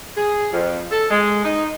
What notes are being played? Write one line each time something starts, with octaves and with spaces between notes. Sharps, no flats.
G#4
F2
A4
G#3
D#4